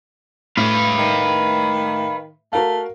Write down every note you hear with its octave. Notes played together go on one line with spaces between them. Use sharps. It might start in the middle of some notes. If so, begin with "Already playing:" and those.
A2 B4 F5
D#3
A3 F#4 A#4 F5